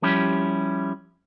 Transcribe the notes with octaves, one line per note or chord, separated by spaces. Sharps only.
F3 G3 C#4 E4 G4